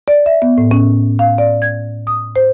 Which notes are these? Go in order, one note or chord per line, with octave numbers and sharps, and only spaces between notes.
D5
E5
B3
A2
C#4
F5
D5
G#6
D#6
C5